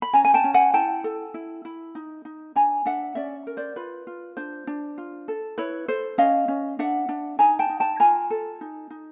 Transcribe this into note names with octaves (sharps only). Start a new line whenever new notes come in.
B5
C#4 G#5 A#5
G#5
G5 A5
C#4
F#5 G#5
E4 G5 A5
A4
E4
E4
D#4
D#4
D4 G#5 A#5
D4 E5 F#5
C#4 D5 E5
A#4
C5 D5
F4 B4
F4
D4 C5
D4
F4
A4
E4 B4 C#5
A4 C5
C#4 D#5 F5
C#4
D4 E5 F#5
D4
D#4 G#5 A#5
G5 A5
D#4
G5 A5
F4 G#5 A#5
A4
D#4
D#4